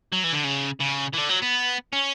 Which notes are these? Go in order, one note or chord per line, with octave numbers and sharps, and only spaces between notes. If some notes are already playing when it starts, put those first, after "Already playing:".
F#3
E3
D3
C#3
C#3
E3
D3
F#3
B3
C#4